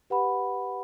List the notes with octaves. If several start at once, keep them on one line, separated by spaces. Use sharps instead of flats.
G4 B4 F#5 B5